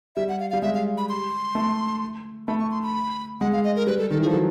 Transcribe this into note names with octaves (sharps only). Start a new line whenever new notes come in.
G3 E5
F#5
F5
G3 F5
G#3 E5
F5
B5
C6
A3
A3 B5
C#6
C6
B5
G#3 F#5
F5
D#5
A#4
G3 B4
A4
D#3 A4
E3
G#4
F3
A4
F#3